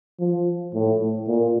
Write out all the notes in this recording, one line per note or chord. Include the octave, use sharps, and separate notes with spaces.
F3
A2
A#2